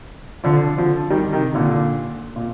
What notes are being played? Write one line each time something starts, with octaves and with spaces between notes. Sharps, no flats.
D3 F3
D3 F3
D#3 G3
C3 D#3
A#2 D3
A#2